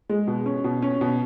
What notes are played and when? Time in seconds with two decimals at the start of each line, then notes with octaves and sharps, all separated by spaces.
0.09 G#3
0.27 B2
0.46 C#4
0.64 B2
0.82 C#4
1.01 B2